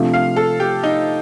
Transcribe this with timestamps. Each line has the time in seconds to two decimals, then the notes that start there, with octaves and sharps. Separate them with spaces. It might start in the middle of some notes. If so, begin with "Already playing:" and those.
Already playing: C3 F3 A3 D4 F4
0.14 F5
0.36 A4
0.60 G4
0.83 D#4